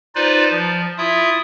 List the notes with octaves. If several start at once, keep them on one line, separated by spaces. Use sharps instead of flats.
D#4 F4 B4 C5 D5
F3
E4 F4 E5 D#6